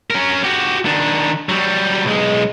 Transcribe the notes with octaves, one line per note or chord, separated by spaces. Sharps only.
C#4 A#4
F#4 G4
D#3 D4
F#3 G3
B1 G#3